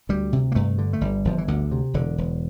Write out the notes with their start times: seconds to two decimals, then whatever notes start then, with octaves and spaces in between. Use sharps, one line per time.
0.09 D2 G3
0.33 C3
0.52 A#3
0.55 G2 A3
0.78 D3
0.93 A3
1.01 G1 G3
1.25 G1 F3
1.38 E3
1.48 D2 D3
1.71 C3
1.94 E1 D3
2.18 E1